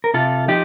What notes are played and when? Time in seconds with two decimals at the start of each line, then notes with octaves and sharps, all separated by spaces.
0.04 A#4
0.14 C3 F4 A4
0.48 F3 D#4 G4